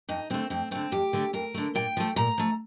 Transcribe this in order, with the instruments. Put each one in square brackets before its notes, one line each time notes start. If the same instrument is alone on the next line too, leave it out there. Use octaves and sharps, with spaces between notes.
[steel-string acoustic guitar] F2 D#4
D3 A3 C4
F2 C4
D3 A3 C4
F2 G4
D3 A3
F2 A#4
D3 A3
A#2 G5
F3 A3
A#2 A#5
F3 A3